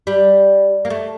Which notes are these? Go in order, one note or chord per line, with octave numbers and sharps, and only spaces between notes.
G3
A#3
A3